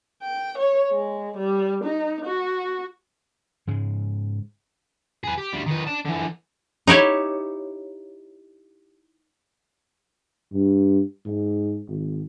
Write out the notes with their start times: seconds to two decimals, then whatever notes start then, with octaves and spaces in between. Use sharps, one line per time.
0.22 G5
0.58 C#5
0.92 G#3
1.37 G3
1.84 D#4
2.25 F#4
3.67 G#2 C#3 G#3
5.24 G#4 B4
5.38 G4
5.53 D2 G3
5.66 D#3 B4
5.87 D5 A5
6.05 D3 E3
6.87 D#4 E4 G4 C#5
10.53 G2
11.26 G#2
11.89 G#1